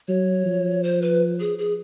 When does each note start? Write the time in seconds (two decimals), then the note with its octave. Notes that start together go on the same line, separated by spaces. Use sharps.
0.08 F#3 C#5
0.46 F3
0.83 C5
1.02 B4
1.40 G#4
1.58 G#4